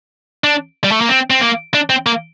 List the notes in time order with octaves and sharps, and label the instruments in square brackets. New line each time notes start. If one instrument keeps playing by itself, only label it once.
[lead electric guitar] D4
G3
A3
A#3
C4
C4
A#3
D4
C4
A#3